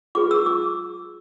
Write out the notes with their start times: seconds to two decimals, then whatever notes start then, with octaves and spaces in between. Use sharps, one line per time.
0.15 F4 G#4 B4 D6
0.31 E6
0.46 D6